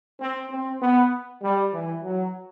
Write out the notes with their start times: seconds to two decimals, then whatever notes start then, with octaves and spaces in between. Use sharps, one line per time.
0.19 C4
0.51 C4
0.81 B3
1.42 G3
1.74 E3
2.03 F#3